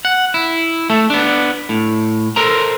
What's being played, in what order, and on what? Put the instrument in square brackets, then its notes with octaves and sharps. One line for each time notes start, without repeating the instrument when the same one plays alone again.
[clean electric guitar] F#5
E4
A3 A4
B3 D4
A2
A4 A#4 C5 A#5